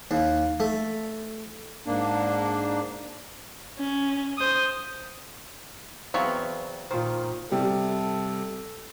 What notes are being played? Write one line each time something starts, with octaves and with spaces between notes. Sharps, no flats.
D#2
A3
G#2 A#3 D4
C#4
C5 D#6
E2 F#3 B3 C4 C#5 F5
A#2 D#3 F4 C5
C3 G3 A4